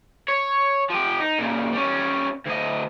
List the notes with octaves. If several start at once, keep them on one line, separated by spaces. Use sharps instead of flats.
C#5
F3 G4
D#4
A#2 C#3
G3 C#4
D2 D#5